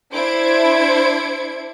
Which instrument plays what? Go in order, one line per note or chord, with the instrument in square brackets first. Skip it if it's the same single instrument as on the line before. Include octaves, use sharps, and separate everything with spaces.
[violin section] D4 E4 C5 G#6 D7